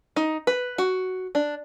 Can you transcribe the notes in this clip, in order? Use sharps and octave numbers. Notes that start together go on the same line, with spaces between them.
D#4
B4
F#4
D4